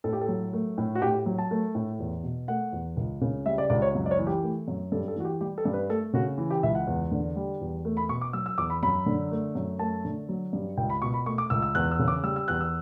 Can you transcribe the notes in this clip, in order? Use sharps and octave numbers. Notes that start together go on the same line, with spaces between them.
A2 A4
G4
A4
F#3
A3
A2
F#4
A2 G4
G4
F#3
A5
A3
A2
E2
B2
A3 F#5
E2
C#2
C#3
G3 E5
D5
C#2 D5
C#5
F#2
D5
C#5
E3
G4
A3
F#2
G2 A4
A4
E3 F#4
G4
G3 G4
A4
G2
B4
A3 A4
C#3 F#4
E3
G4
C#2 E5
F#5
E2
D3
G3
E2
A3
B5
B2 C#6
D6
F#3 E6
E6
E2 D6
B5
F#2 B5
D3
A3
F#2
A3 A5
D3
F#3
G2
C#2 G5
B5
B2 C#6
B5
A3 C#6
D6
C#2 E6
E6
E2 F#6
E6
C#3
D6
G3 E6
E6
E2 F#6
E6